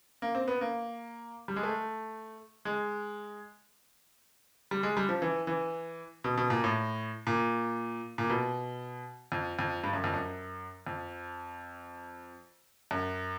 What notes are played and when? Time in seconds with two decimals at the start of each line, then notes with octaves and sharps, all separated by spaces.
0.22 A#3
0.35 C4
0.48 B3
0.61 A#3
1.48 G3
1.56 G#3
1.63 A3
2.65 G#3
4.71 G3
4.83 G#3
4.97 G3
5.09 F3
5.22 E3
5.47 E3
6.24 B2
6.38 B2
6.50 A#2
6.64 A2
7.27 A#2
8.18 A#2
8.30 B2
9.32 F2
9.59 F2
9.84 G2
9.93 F#2
10.04 F2
10.14 F#2
10.87 F2
12.91 F#2